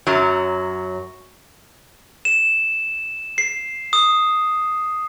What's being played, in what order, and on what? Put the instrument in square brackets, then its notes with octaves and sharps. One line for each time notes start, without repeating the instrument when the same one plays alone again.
[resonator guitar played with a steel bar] F#2 F#3
[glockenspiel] E7
C7
D#6